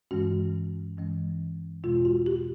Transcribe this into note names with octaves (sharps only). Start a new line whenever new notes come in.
G2 E3 G#3 C#4 F#4
G2 E3 G#3 C#4
E2 B2 G#3 F4
F#4
G4